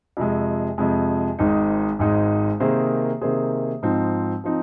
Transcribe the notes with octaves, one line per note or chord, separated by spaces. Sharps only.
F2 C3 G#3
F2 C3 G#3
G#1 G#2 G#3 D#4
G#1 G#2 G#3 D#4
C3 D#3 A#3 G#4 C5
C3 D#3 A#3 G#4 C5
G#2 F3 C4 D#4
F3 C4 D#4